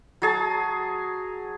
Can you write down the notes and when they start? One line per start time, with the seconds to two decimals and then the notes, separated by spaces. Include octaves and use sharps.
0.22 F#3 G#4 A5